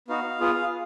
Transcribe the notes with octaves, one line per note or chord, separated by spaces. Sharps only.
B3 D#4 F#4 F5
B3 F4 G#4